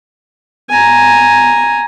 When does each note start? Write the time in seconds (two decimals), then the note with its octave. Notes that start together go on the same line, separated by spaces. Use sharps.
0.70 G#5 A#5